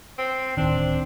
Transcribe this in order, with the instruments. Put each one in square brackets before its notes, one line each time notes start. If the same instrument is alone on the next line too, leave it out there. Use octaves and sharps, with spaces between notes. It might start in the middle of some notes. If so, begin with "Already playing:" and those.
[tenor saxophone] C4
[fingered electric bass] D1 D#3 [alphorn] C4 [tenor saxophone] D4